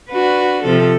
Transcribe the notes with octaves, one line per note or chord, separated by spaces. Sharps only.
D4 F#4 B4
C3 F3 A4